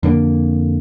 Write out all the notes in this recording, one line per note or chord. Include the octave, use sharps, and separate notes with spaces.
F2 D3 A#3